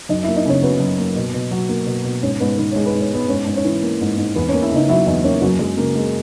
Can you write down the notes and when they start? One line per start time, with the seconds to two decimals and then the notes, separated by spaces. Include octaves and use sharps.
0.09 F#2 D#4 D#5
0.23 E4 E5
0.28 A#3
0.36 D#4 D#5
0.45 C#3 C#4 C#5
0.62 F#3 B3 B4
0.80 F#2
0.98 A#3
1.16 B2
1.34 B2
1.51 F#3
1.69 A#3
1.87 B2
2.04 B2
2.23 G#2 C#4 C#5
2.40 G#2 B3 B4
2.58 D#3 B4
2.72 G#3 C#5
2.86 B4
2.94 G#2
3.00 C#5
3.12 G#2 B3 B4
3.29 G#2 C#4 C#5
3.46 G#2
3.55 C#4 C#5
3.65 E3
3.83 A#3
4.01 G#2
4.17 G#2
4.35 E2 B3 B4
4.48 C#4 C#5
4.53 A#3
4.62 E4 E5
4.72 C#3 D#4 D#5
4.88 F#3 E4 E5
5.06 E2 D#4 D#5
5.24 A#3 C#4 C#5
5.42 F#2 F#3 F#4
5.59 F#2 G#3 G#4
5.77 C#3 A#3 A#4
5.95 G#3